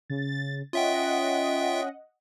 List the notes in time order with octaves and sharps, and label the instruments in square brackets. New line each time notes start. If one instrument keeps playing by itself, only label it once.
[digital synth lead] C#3 [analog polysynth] A6
[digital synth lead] C#4 [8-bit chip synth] F4 E5 G5 [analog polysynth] D#5 F#5